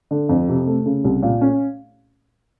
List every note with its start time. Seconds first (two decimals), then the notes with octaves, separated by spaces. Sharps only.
0.11 D3
0.29 F2
0.49 C3
0.67 A3
0.86 C#3
1.04 C2
1.23 A#2
1.41 C#4